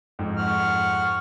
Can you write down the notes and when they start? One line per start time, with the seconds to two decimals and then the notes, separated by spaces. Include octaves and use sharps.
0.19 F2 G#2
0.37 F#5 C#6 F6